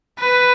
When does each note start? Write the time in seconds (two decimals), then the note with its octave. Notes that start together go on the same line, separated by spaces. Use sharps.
0.19 B4